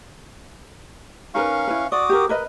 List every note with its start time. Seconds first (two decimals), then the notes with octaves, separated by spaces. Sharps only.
1.35 C#4 D#4 A#4 B4 F5 C#6
1.67 E4 B4
1.92 F#4 D5 D6 D#6
2.09 G4 A#4
2.29 A#4 B4 D#5